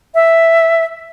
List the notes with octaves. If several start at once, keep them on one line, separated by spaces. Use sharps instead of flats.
E5